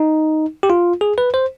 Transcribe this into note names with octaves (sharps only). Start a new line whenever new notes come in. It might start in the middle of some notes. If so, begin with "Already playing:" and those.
Already playing: D#4
G4
F4
G#4
B4
C5